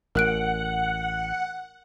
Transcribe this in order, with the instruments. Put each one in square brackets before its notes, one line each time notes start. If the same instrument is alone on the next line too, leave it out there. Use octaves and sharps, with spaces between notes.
[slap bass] A1 [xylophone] A#4 F#6 D7 [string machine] F#5